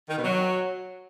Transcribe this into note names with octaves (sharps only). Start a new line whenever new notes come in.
D#3
B2
F#3